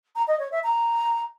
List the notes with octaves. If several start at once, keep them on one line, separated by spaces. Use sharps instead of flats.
A#5
D#5
C#5
E5
A#5